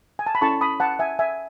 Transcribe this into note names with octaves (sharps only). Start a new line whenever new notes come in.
G#5
A5
B5
C#4 E4 A4 A5 C#6
B5 D#6
F#5 A5
E5 G#5
E5 G#5